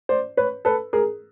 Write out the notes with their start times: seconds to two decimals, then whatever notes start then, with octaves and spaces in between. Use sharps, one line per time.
0.09 C5 D5
0.37 B4 C#5
0.65 A4 B4
0.93 G#4 A#4